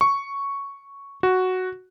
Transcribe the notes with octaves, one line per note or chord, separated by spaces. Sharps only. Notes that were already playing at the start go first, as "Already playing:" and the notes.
C#6
F#4